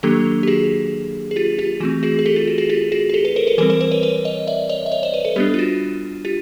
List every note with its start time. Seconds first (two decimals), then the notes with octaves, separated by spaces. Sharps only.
0.03 D#3 F#3 A#3 D4 G4 A4
0.43 G4
0.47 F#4 G#4
1.31 G#4
1.36 F4 G4
1.58 F4 G4
1.80 E3 A3 C4 F#4
2.03 F#4 G#4
2.19 G#4
2.26 G4 A4
2.36 F4
2.48 F#4
2.58 F#4 G#4
2.69 F4 G4
2.92 F#4 G#4
3.10 G#4
3.14 G4 A4
3.25 A4 B4
3.36 A#4 C5
3.47 A4 B4
3.58 E3 G3 C4 A#4 C5
3.70 A#4 C5
3.81 A#4 C5
3.91 B4 C#5
4.03 B4 C#5
4.25 C#5 D#5
4.47 D5 E5
4.69 C#5 D#5
4.86 E5
4.92 C#5 D#5
5.03 C5 D5
5.14 B4 C#5
5.25 A4 B4
5.36 G3 B3 D4 G4 A4
5.54 F4
5.59 F#4
6.25 F4 G4